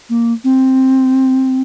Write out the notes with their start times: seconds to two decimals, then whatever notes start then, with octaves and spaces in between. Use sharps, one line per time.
0.09 A#3
0.44 C4